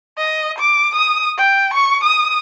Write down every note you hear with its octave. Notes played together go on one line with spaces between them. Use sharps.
D#5
D6
D#6
G5
C#6
D#6